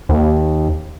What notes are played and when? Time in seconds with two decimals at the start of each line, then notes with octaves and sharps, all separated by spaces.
0.09 D#2